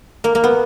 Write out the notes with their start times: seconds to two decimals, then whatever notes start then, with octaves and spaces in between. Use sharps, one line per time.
0.24 A#3
0.35 A#3
0.44 B3